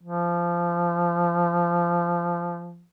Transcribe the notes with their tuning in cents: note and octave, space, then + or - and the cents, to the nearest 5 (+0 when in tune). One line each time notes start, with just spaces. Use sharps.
F3 -20